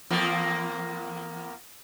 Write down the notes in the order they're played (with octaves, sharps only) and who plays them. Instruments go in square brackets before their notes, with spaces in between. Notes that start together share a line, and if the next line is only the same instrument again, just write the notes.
[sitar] E2 F3 A#3